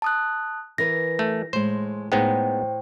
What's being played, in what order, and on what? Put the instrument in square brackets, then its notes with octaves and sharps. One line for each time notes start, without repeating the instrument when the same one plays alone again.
[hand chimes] A5 D#6 F#6
[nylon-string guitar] E3 A#4 B4 [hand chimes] A#6
[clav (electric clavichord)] A3
[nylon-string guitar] A2 G#3 [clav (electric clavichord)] C5
[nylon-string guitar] A2 [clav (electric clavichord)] G#3 B3 D#4 [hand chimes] C5 G5